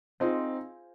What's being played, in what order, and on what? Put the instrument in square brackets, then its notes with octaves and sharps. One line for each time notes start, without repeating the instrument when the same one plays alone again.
[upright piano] C4 D#4 [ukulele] F4 G#4 C5